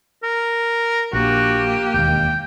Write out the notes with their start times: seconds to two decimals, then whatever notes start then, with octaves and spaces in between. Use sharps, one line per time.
0.23 A#4
1.13 A#1 A#3 F#4 G4
1.94 E1 D#2 G5